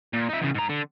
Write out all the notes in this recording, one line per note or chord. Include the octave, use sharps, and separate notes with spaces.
A#2
D#4 E5
E2 C#3
G#2 A#5
D3